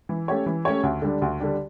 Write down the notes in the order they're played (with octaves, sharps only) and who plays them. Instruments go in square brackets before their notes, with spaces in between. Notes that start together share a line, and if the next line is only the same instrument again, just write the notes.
[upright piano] E3
A3 C#4 G4 C#5
E3
A3 C#4 G4 C#5
D2
D3 G3 D4
D2
D3 G3 D4